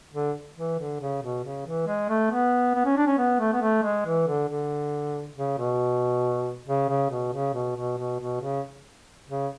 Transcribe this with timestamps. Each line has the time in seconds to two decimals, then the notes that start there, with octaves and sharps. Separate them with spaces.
0.13 D3
0.57 E3
0.79 D3
1.01 C#3
1.23 B2
1.44 C#3
1.66 E3
1.87 G#3
2.09 A3
2.32 B3
2.75 B3
2.86 C#4
2.97 D4
3.07 C#4
3.18 B3
3.40 A3
3.53 B3
3.61 A3
3.83 G#3
4.06 E3
4.28 D3
4.49 D3
5.36 C#3
5.58 B2
6.67 C#3
6.89 C#3
7.10 B2
7.33 C#3
7.54 B2
7.76 B2
7.98 B2
8.20 B2
8.41 C#3
9.29 C#3